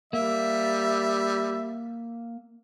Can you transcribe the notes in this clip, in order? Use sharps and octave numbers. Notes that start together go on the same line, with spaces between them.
G3 A#3 E5